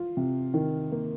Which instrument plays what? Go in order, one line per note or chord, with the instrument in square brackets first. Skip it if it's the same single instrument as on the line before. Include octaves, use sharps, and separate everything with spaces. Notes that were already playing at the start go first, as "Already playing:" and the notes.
Already playing: [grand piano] F4
C3
D#3
A#3